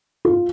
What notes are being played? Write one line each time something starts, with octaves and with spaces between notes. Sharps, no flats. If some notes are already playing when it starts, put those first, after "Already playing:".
F4